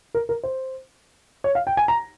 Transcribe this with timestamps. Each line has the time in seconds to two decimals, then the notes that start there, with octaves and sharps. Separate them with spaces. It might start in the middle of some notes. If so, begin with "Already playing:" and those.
0.14 A#4
0.29 A#4
0.43 C5
1.44 C#5
1.55 F5
1.67 G5
1.77 G#5
1.88 A#5